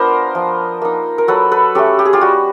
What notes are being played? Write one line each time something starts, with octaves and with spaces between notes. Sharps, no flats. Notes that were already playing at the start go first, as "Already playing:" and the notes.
Already playing: B3 D4 F4 A#4 C5
F3
A#3 D#4
A#4
F#3 A4 B4
A4 B4
A3 C#4 G4 A4
G4
G#4
F4 G4
G3 F#4